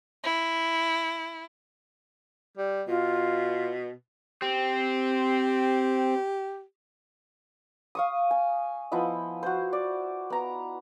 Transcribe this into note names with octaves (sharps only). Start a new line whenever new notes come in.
E4
G3
B2 F4
C4 G4
F5 C#6 D#6
G#5
F3 B3 E4 D#5
F#4 C5
D5
B3 A#5